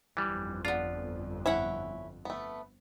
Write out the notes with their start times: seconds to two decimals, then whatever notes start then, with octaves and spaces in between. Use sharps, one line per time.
0.17 G1 F2 E3 G3
0.65 B3 D4 F4
1.46 C#4 E4 E5 F#5
2.25 A3 B3